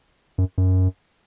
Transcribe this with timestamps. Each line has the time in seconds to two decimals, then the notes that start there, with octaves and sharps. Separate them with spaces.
0.38 F#2
0.58 F#2